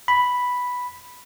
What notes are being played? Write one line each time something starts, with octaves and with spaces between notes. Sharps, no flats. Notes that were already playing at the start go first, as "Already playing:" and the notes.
B5